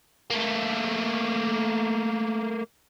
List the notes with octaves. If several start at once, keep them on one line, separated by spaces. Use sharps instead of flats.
A3 A#3